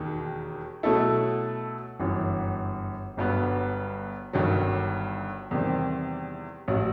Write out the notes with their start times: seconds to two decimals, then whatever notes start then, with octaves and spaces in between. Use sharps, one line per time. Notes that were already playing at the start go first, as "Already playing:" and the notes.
Already playing: E1 D#2 D#3
0.83 B2 F#3 A3 E4 A4
1.99 G1 F#2 E3
3.17 G1 G2 F#3 B3
4.33 G1 G2 D#3 F#3
5.51 E2 C3 D#3 G3 C4
6.68 A1 F#3